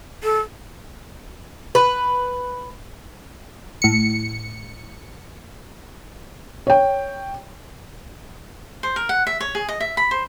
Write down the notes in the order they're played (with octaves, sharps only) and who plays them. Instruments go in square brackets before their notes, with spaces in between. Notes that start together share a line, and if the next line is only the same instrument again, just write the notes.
[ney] A4
[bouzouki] B4
[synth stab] A2 C#7
[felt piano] C#5 G5
[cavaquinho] C5
A#4
F#5
E5
C#5
G#4
D#5
E5
B5
C5